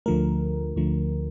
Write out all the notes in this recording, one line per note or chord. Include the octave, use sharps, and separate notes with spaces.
D2 D3 F3 A3 A#4
D2 D3 F3 A3